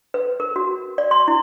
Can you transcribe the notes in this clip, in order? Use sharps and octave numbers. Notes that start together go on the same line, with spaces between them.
B4
A#4
F#4
D5
C6
E4